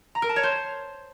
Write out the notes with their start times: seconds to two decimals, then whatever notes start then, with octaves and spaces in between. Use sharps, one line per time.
0.15 A#5
0.22 A#4
0.29 A5
0.36 C#5
0.43 C5